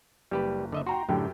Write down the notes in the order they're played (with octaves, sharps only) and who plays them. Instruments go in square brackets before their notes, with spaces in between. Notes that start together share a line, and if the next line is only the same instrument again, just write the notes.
[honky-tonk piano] F#1 [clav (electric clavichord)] G3 G4 B4
[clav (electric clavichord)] D3 D#5 E5
[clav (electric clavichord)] F#4 [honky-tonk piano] G5 A#5 C6
[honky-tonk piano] F#2 G4 G5 [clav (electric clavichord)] A2 D3